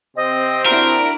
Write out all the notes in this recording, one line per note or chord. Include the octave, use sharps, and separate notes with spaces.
C3 C4 D#5
D4 E4 F#4 A#4 D7